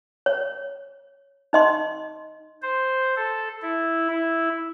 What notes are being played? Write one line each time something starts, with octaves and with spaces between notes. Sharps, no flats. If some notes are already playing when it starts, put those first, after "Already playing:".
C#5
D#4 D#5 C6
C5
A4
E4
E4